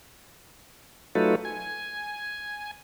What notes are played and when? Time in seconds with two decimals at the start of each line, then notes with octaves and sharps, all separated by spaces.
1.15 F#3 A3 D#4 F4 A4 B4
1.45 G#5